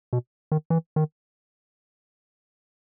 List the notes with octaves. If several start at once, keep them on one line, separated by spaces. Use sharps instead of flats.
B2
D#3
E3
D#3